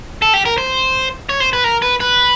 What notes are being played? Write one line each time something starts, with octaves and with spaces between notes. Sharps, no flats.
A4
G4
A#4
C5
C#5
C5
B4
A#4
B4
B4